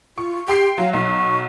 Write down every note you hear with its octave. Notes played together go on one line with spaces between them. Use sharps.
F4 C#6
G4 G5 C6 C7
F#3 F5
B1 F#3 C#6